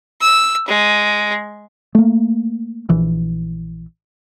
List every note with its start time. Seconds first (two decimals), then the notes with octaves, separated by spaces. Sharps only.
0.21 E6
0.67 G#3
1.95 A3 A#3
2.89 A#1 E3